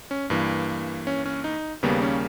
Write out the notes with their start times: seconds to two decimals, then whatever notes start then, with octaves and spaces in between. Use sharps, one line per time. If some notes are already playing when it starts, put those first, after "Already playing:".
0.11 C#4
0.30 G2 E3 A#3
1.07 C#4
1.26 C#4
1.44 D#4
1.83 D#2 C#3 G3 A#3 B3
2.02 C#4